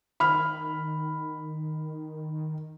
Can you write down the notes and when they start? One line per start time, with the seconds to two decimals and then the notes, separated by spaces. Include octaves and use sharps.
0.20 D#3 B5 F6